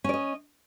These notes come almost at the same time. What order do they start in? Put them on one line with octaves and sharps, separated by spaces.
C#4 D5 D#5